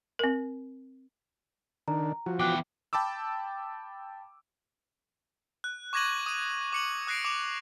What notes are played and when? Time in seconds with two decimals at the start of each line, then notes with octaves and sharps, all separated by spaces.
0.19 C4 A#4
1.88 D#3 D4 A#5
2.26 F3 F#4
2.40 E2 G5 D6 F#6
2.93 G5 A5 B5 D6 E6
5.64 F#6
5.93 C#6 D6 G#6 A#6 D#7 F#7
6.26 D#6 D#7
6.72 D6 C#7 F#7
7.07 D#6 F#6 A#6 C7 D7
7.25 D6 F7